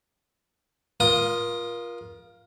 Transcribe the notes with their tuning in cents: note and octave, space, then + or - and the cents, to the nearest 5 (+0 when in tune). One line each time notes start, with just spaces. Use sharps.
F4 +0 A#4 +30 D#6 -10